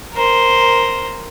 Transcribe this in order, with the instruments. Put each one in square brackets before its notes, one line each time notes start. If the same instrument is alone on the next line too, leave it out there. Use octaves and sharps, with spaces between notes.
[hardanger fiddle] A#4 C5